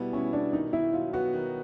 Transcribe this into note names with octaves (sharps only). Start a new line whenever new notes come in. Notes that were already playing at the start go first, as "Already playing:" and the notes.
Already playing: B2 G3 B3 E4
C#4 E4
B2 D4
D#3 D#4
D#3 E4
F#3 F4
B3 F#4
D#3